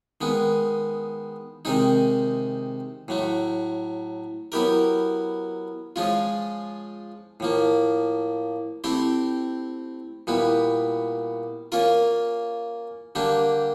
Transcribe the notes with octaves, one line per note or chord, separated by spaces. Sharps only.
D#3 G#3 B3
C3 D#3 G#3 C4 D#4
A2 F#3 A3
F#3 B3 E4 G4 A#4
F3 G#3 C#4 F4
A2 F3 A#3
A3 C4 E4 G4 C5
A#2 G3 B3 E4
A#3 C#4 F4 A#4
D3 G3 A#3 D4 G4